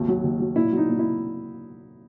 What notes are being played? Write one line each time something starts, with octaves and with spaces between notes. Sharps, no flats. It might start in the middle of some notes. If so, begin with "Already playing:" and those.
Already playing: G#1 D#2
F#3
D#2
F#3
A#2 E4
F#3 D#4
A#2
E4